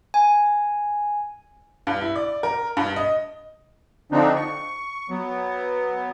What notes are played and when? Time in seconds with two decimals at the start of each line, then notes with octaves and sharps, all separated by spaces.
0.14 G#5
1.87 G2
2.01 E4
2.16 D5
2.43 A#4
2.77 G2
2.96 D#5
4.12 D3 F3 C4 D4 D#4
4.36 C#6
5.10 F#3 B3